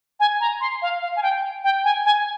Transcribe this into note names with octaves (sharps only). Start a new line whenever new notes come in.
G#5
A#5
C6
F5
F5
G#5
G5
G5
G#5
G#5